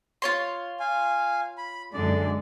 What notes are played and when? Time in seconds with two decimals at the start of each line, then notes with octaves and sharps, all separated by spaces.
0.22 F4 C#5 C6
0.80 F5 G#5
1.58 B5
1.93 F#2 D3 G#3 D5